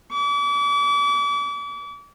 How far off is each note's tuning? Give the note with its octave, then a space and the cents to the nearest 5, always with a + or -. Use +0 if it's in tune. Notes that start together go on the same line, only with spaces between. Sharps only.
D6 -40